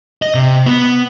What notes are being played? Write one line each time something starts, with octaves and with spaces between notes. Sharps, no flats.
D#5
C3
B3